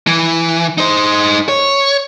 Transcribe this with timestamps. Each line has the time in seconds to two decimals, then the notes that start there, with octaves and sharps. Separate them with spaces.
0.07 E3
0.78 D#4 C5
1.49 C#5